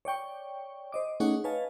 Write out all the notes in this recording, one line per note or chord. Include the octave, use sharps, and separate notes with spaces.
C#5 D5 G5 C#6
C5 D#5 D6
A3 C#4 D#4 G#4 C#5 F#5
B4 C#5 D#5 F5 G#5 A5